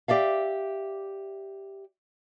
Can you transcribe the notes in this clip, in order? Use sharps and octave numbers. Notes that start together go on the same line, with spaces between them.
G4 D5 E5 F5